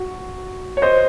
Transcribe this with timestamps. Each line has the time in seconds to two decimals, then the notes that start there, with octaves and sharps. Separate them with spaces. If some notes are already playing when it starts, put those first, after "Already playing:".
Already playing: F#4
0.77 C#5
0.82 C5 D#5